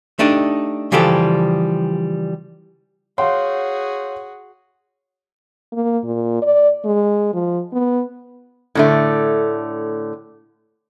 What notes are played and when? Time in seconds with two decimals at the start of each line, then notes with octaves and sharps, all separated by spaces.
0.19 A3 D4 D#4 G4
0.92 C#3 E3 F3 G3 G4 A4
3.18 F#4 G#4 C#5 F5 F#5 C6
5.72 A#3
6.04 A#2
6.42 D5
6.85 G#3
7.34 F3
7.72 B3
8.75 A2 D3 A3